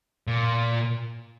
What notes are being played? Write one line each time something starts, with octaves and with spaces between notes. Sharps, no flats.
A#2